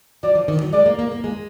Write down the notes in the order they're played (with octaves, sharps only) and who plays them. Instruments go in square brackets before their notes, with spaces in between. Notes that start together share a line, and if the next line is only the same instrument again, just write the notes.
[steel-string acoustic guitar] F#3 [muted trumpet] D5
[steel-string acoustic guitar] F3
D#3
F#3
[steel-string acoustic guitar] G#3 [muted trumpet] D5
[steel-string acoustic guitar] A#3
A#3
A#3
G#3